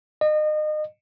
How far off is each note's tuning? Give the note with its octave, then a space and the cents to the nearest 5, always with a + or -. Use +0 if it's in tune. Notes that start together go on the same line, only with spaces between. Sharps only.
D#5 -30